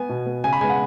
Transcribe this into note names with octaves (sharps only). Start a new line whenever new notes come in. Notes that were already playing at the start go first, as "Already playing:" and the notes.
Already playing: B3 G#5
B2
B3
C#3 G#5
B5
G#3 B3 G#5
F#5